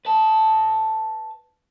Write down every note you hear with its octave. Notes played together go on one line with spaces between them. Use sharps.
B4 A5